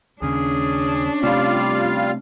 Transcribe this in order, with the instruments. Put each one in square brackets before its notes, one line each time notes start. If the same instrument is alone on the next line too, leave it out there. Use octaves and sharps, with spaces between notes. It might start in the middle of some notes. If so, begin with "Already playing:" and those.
[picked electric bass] D#2 C#3 [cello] C#4 D4 [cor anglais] G#4
[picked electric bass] C3 A3 C4 [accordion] G3 F4 F5 [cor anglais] D5